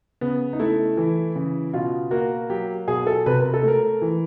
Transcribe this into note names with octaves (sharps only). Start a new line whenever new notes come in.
C#3 B3
D#4
A3 E4
E3
C#3
B2 F4
A#3 F#4
F#3 G4
B2 G#4
A4
C3 B4
A#4
A4
A3 A#4
E3